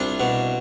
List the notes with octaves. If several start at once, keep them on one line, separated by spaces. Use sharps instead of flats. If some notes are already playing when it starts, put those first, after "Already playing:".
Already playing: C2 D4 F4
B2